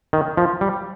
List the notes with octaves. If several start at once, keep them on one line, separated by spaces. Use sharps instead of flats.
D#3
F3
G3